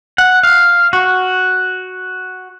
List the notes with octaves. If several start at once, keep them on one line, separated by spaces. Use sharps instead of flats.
F#5
F5
F#4